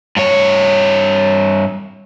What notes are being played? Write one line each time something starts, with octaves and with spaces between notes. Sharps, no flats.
G2 C#5